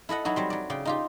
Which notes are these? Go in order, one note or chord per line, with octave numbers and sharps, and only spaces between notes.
E4 A4 D#5 F#5
F#3 D#4 E4 F#4
F#3 G3 C4
F#3 D5
C#3 D5 G5
D#4 F4 G4